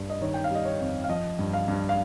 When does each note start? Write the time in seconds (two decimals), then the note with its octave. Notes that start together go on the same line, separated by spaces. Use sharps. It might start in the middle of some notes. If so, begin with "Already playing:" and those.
Already playing: G2
0.10 D#5
0.21 D#3 C#5
0.34 G5
0.44 F5
0.51 G3 D#5
0.65 C#5
0.80 F2
1.04 F5
1.09 F3 D#5
1.39 G2
1.54 F5
1.68 G2
1.89 F5